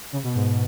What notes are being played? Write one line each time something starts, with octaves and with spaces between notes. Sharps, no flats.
C#3
B2
G#2